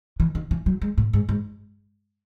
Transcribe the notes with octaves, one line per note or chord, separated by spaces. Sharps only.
E3
D#3
E3
F#3
G#3
A2
G#2
G#2